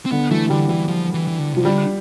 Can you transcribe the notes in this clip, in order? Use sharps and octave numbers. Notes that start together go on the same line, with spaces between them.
C4
D3 B3
E3 A3
D3 G3
E3 G3
F3
E3
E3
D3
C3 F3
D3 G3